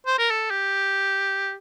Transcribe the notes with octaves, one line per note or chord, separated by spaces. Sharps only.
C5
A#4
A4
G4